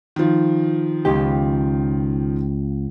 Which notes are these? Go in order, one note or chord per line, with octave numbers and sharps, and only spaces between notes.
D#3 F3
C#2 G4